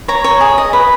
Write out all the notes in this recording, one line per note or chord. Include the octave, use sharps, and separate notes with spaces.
C#5 A#5
C#5
G#4
D#5
B4